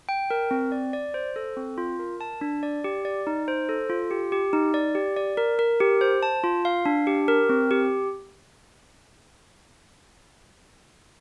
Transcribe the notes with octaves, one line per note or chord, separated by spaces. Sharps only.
G5
A#4
C4
D5
D5
C5
A4
C4
F4
A#4
A5
D4
D5
G4
D5
D#4
C5
A4
F4
G4
G4
D#4
D5
G4
D5
A#4
A#4
G4
C5
A5
F4
F5
D4
G4
A#4
C4
G4